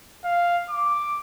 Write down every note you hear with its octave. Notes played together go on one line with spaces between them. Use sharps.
F5
D6